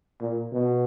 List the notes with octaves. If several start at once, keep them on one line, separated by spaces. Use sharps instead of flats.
A#2
B2